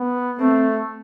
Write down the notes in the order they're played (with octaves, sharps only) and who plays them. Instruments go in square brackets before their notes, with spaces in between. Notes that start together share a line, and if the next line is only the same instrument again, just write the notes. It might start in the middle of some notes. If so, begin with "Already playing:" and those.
Already playing: [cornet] B3
[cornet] A3 [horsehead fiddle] C4